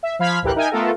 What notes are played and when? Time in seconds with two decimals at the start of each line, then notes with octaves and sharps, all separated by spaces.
0.03 E5
0.19 F3 F5 B5 F6 G#6 B6
0.42 A1 D2 E3 G4 A#4 F#6
0.56 D#4 A#4 E5 G5 G#5
0.71 A3 B3 F4 A4 A#4